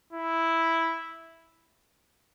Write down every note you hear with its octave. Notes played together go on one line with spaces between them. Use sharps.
E4